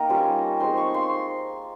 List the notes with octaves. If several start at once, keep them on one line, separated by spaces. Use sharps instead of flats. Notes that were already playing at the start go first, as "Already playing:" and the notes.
Already playing: A#3 D#4 G5 A#5
G3 C#4 F4
G#3 C4 D#4 C6
C#6
C6